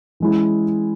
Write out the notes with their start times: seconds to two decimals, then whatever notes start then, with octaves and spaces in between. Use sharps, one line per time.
0.20 E3 G#3 C#4 E4